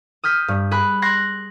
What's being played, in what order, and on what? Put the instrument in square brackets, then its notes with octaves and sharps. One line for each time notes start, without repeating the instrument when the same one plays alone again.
[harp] D#6 F6 G6 B6
G2
G#4 B5 F#6
C6 F#6 G#6 A#6 C7